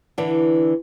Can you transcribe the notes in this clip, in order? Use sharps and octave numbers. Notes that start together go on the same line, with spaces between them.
D3 E3 D4